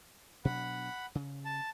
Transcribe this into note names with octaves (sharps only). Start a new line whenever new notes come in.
B2 F#3 D4 F#5 B5
C#3
A5